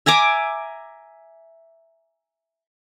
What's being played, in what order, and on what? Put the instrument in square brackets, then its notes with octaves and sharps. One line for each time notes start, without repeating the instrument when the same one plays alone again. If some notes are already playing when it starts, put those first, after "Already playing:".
[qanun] E5 G#5 A#5 D6